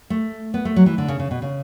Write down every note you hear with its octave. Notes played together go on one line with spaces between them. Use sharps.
A3
B3
A3
F#3
E3
D3
C#3
C#3
B2
C#3